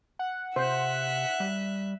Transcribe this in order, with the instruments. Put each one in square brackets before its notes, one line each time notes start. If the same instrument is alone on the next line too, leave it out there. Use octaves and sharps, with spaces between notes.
[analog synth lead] F#5
[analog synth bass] C3 [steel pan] C5 [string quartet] E5 F#6
[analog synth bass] G3